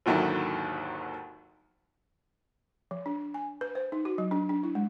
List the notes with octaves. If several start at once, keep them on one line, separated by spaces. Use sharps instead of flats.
G#1 D#2 D3 D#3 F#3 E4
F3
D4
G#5
B4
C5
D#4
F#4
F#3
D4
D4
E4
G#3